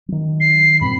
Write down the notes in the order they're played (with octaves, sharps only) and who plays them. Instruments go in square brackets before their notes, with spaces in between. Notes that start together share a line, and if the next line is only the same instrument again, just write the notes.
[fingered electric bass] D#3 F#3
[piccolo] C7
[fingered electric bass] G2 A#2 C4 [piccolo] B5